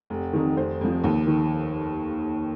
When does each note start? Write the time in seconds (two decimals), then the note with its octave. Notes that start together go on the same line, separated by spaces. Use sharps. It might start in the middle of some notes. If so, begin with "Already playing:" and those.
0.10 F1
0.33 F2 D#3
0.56 F1 C5
0.81 F2 F3
1.04 D#2
1.27 D#3